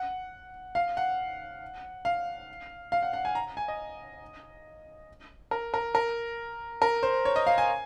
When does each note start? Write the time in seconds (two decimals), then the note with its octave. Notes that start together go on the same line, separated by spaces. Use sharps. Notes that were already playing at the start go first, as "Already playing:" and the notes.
Already playing: F#5
0.75 F5
0.97 F#5
2.05 F5
2.92 F5
3.03 F#5
3.13 F#5
3.25 G#5
3.35 A#5
3.57 G#5
3.68 D#5
5.51 A#4
5.74 A#4
5.95 A#4
6.82 A#4
7.03 C5
7.25 C#5
7.36 D#5
7.47 F5
7.58 G#5